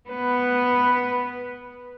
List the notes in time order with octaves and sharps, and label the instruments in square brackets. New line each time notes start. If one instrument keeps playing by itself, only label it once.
[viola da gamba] B3 B4